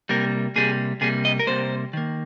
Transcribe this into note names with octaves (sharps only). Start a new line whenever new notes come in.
C3 G3 A#3 A#4
C3 G3 A#3 G#4
C3 G3 A#3 G#4
D#5
A#4
C3 G3 A#3 C5
D#3 A#3